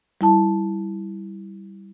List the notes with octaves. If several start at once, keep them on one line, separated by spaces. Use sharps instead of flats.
G3 E4 A5